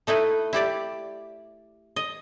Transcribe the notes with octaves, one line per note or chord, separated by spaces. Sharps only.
A3 D#4 E4 B4
E4 G4 D5
D#5